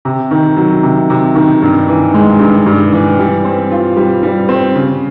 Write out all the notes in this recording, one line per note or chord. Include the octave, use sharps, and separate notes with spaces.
C3
D#3
F#3
C3
C3
D#3
G2
E3
G#3
G2
G2
E3
G3
C4
F4
G3
G3
C4
C#3